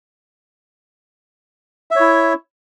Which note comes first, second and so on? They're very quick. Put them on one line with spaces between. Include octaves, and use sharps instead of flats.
E5 C#5 E4